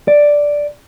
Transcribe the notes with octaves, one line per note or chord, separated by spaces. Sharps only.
D5